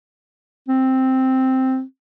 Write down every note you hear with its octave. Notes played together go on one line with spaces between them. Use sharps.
C4